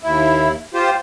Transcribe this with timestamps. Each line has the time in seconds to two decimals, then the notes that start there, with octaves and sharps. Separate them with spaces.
0.03 D#2 E4
0.74 F4 G4 C5